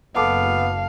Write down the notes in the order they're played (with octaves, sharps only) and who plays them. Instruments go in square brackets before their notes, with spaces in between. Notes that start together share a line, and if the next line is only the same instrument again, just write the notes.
[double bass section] F#1 [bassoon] B3 [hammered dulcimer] A4 D6 [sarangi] F5